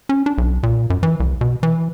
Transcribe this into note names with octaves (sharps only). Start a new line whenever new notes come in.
C#4
D4
B1
A#2
F#2
E3
C2
B2
E3